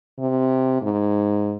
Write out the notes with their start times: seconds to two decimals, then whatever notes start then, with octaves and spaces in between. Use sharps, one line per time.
0.19 C3
0.81 G#2